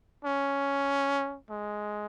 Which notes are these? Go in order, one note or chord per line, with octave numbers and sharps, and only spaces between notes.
C#4
G#3